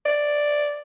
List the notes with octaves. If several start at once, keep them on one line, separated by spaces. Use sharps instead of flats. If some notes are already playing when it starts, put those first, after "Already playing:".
D5